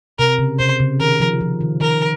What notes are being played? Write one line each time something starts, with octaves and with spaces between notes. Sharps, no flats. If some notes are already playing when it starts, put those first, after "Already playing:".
C3 A#4
C#3
C3 C5
C#3
D#3 A#4
F3
F3
D#3
D#3 A#4